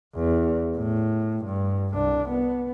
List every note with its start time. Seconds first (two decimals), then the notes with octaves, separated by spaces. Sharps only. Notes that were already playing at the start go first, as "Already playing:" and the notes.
0.15 E2
0.77 A2
1.45 G2
1.94 C2 D4
2.29 B3